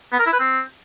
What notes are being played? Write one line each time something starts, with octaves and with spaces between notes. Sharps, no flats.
B3
A#4
E4
B4
C4